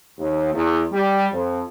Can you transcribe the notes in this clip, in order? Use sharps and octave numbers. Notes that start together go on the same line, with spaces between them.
D#2
E2
G3
F2